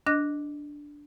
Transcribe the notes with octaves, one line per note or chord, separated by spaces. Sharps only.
D4 D#5 F#6 A#6